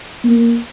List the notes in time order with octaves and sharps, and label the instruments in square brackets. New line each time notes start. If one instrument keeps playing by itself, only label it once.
[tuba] A#3